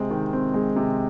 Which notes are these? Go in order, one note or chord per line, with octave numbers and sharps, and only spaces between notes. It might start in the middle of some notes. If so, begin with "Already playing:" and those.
Already playing: C3 G#3 C4
D#3
C4
G#3
C3